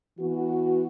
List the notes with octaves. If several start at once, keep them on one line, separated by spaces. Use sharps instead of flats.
E3 B3 F#4